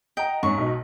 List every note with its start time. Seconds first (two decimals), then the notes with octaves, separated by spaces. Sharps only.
0.17 D#5 F#5 G5 A#5
0.43 G#2 C#4 C#6
0.58 B1 B2 D#4